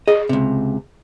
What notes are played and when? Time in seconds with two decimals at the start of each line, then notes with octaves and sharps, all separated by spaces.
0.08 G#4 D#5
0.29 C#2 C3